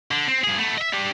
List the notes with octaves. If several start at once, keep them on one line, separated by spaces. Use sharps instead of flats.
D3
C4
G2 G#4
A3 B3
D#5 E5
D4 G4